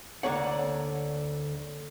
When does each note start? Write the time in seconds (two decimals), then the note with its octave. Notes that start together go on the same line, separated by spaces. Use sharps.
0.23 D2 D3 F#3 A#3 C#5 F#5